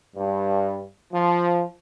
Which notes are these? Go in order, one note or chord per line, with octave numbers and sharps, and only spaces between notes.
G2
F3